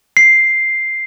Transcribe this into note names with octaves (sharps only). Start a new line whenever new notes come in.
C7